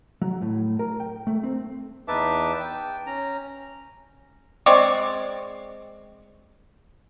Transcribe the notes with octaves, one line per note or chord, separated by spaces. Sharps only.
F#3
A2
A#4
G5
A3
C4
E2 D#4 B4 E5 A5 D6
G5
C#4 A#5
G#3 C4 D5 C#6